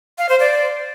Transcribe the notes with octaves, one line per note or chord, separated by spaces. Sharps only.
F5
C5
D5